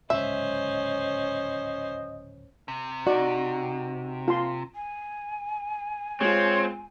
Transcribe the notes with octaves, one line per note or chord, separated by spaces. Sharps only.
D1 C#2 G#2 C#4 C5 D#5 E5
C3
D#4 F#4 D5
F4 A5 C6
G#5
G#3 C4 F4 C#5